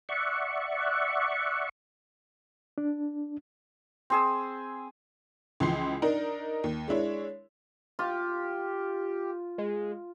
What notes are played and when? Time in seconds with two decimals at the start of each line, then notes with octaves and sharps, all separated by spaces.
0.09 D5 E5 F#5 C#6
2.78 D4
4.10 C4 G#4 E6
5.60 C#2 E3 F3 C6 C7
6.02 D4 D#4 A#4
6.64 D#2
6.88 G#3 D4 E4 C#5
7.99 F4 G4
9.58 G#3